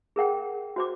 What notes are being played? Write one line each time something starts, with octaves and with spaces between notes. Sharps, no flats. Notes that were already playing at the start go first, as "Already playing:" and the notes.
G#4 A#4 F#5 G5
F#4 C5 D6